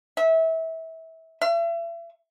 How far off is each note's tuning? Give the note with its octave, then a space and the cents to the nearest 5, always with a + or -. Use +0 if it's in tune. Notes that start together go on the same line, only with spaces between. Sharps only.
E5 -25
E5 +40